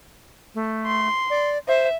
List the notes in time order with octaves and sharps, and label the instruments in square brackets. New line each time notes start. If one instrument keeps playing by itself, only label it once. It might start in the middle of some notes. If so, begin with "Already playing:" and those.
[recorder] A3
[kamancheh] C6
[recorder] D5
[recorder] C5 [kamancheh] E5